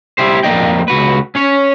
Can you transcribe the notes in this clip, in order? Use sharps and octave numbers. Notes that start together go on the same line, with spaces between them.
G3 E4 G4 C5
F2 A#3 D5 D#5 G5
C#2 F#4 B4
C#4 C#5